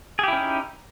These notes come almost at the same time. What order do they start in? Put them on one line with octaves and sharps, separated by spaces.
G#4 G4 E4 C#4 D#4